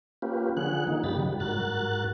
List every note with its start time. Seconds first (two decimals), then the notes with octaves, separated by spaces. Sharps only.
0.22 A#3 C#4 F4 G4 B4
0.57 D3 F3 G#4 F#5 F#6
0.87 D#3 F3 A#3 D#4
1.04 G2 C#3 G4 B5 A6
1.20 F#3 G3
1.40 G#2 F#4 A#4 F#6 A6